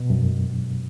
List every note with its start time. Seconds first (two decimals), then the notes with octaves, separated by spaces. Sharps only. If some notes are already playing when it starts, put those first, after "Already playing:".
Already playing: B2
0.10 F#2